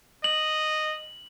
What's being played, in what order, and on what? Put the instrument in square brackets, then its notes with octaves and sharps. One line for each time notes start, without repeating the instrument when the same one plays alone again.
[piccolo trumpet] D#5 [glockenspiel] F#7